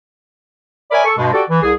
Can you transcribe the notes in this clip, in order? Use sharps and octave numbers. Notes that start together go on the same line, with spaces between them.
A#4 C#5 D5 E5 G#5 B5
A4 C#6
G2 B2 G#3
F#4 G4 A4 D5
E3
C2 G#4